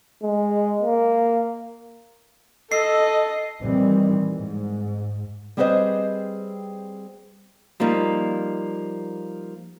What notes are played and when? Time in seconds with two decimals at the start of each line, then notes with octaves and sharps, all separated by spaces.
0.23 G#3
0.82 A#3
2.72 A4 D#5 C7
3.62 A#2 D#3 E3 G3 C4
4.36 G#2
5.57 G3 C4 G#4 B4 C5 D#5
7.80 F3 G3 A#3 D#4